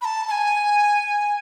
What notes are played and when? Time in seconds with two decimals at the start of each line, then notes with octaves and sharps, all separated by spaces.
0.02 B5
0.05 A5
0.28 A5
0.31 G#5